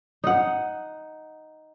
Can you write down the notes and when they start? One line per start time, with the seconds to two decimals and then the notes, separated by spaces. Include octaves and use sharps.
0.24 D#4 F#5